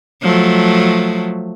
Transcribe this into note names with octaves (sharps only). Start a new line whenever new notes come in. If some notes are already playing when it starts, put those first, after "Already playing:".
F3 F#3 A3